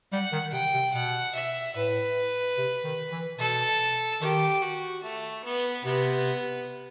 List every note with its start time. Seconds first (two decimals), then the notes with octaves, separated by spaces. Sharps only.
0.12 G3 F#5
0.32 D#3
0.52 C3 G5
0.74 C3
0.94 B2 F#5
1.35 E5
1.76 A2 B4
2.58 C3
2.84 D#3
3.12 E3
3.39 B2 A4
4.21 D#3 G4
4.62 F#4
5.03 A3
5.44 B3
5.84 C3 B3